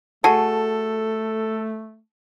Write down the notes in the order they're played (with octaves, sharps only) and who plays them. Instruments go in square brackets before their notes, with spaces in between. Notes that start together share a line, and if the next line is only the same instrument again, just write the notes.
[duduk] A3 [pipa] F#4 G#4 [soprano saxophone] A4 [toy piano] A5